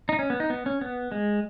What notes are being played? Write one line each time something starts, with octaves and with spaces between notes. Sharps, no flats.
D#4
C#4
B3
D#4
B3
C#4
B3
G#3